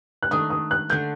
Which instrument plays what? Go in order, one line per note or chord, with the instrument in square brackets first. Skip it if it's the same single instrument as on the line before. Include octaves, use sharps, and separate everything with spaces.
[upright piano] F#6
[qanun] D#3 A3 D4 [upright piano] D#6
[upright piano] D#6
F#6
[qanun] D3 A3 D4 [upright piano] G6